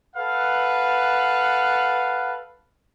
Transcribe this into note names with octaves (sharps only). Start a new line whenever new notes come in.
A4 B4 F5 F#5